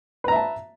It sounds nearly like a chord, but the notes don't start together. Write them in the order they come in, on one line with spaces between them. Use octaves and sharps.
B4 A#5 E5 A5